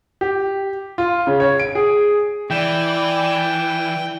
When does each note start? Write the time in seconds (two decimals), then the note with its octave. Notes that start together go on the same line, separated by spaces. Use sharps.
0.21 G4
0.98 F4
1.27 C#3
1.40 C#5
1.60 D7
1.75 G#4
2.50 E3 D5 G5